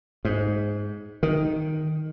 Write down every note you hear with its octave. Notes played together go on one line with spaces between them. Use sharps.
G#2
D#3